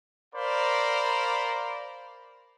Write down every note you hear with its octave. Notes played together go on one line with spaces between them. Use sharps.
A#4 C5 D5 F5 B5